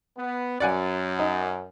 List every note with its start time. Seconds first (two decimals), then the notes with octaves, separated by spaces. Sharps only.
0.17 B3
0.60 F#2 D5 F#5 G#5
1.19 D#4